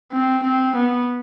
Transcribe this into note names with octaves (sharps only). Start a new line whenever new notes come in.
C4
C4
B3